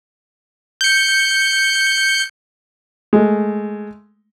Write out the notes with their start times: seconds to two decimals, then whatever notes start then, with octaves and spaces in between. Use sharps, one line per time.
0.81 G6 C#7
3.13 G#3 A3